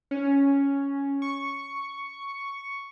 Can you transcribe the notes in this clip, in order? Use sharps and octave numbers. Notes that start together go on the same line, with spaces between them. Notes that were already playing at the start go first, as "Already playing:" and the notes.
C#4
C#6